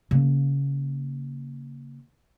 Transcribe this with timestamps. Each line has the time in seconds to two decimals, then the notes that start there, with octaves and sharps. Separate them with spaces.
0.11 C#3 A#3